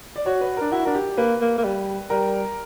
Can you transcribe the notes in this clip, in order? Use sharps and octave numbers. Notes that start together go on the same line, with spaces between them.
D5
F#4 C#5
B4
D4 A#4
E4 F#4
D4 A#4
G4
A#3 B4
A#3
A#3
G3
G3 A#4